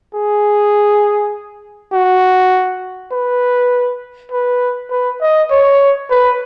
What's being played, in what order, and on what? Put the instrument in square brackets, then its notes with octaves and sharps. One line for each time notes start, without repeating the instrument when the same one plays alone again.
[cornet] G#4
F#4
B4
B4
B4
D#5
C#5
B4